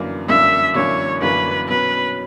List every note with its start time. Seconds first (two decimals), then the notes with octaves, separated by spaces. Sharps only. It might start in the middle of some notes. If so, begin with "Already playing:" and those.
Already playing: G1 F#2 E3 A#3 D4
0.28 G1 F#2 E3 A#3 D4 E5
0.75 G1 F#2 E3 A#3 D4 C#5
1.22 G1 F#2 E3 A#3 D4 B4
1.68 B2 F#3 C#4 B4